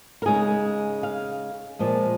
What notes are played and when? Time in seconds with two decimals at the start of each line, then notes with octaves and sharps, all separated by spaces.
0.22 A#4
0.26 C#3 G#3 D#4 G#4
1.03 F5
1.79 A#2 F3 G#3